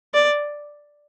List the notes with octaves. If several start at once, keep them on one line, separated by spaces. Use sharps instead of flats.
D5